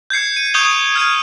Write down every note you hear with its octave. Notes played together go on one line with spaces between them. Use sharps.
G6 G#6 C7 C#7
D#7
C#6 D#6 G6 G#6 F7 G7
F6 G#6 D#7